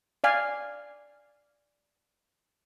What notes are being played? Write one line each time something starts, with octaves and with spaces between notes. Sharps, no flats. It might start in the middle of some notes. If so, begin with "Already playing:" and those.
D5 F5 G#5